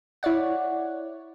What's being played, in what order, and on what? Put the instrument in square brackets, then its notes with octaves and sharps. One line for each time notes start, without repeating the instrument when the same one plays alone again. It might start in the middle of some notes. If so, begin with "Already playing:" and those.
[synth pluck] E4 C#5 D5 F#5